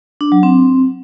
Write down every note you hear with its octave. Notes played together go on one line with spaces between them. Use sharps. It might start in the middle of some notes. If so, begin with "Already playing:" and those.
D4
F#3
C4